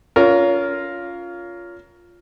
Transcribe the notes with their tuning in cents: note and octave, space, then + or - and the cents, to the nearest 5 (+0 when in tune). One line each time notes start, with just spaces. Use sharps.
C#4 +30 F4 +0 A#4 +0